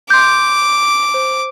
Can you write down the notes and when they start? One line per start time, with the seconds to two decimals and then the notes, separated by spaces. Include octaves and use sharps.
0.10 C6 D6 G6
1.14 C5